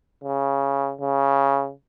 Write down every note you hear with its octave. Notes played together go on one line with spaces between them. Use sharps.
C#3
C#3